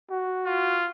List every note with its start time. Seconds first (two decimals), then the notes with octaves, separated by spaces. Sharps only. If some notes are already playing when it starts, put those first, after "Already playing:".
0.11 F#4
0.46 F4